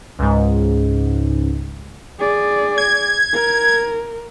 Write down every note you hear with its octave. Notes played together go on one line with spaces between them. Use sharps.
C#2 G#2
G#4 D5
G#6
A#4